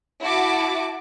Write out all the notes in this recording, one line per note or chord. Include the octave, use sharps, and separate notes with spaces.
E4 F#4 A5 D6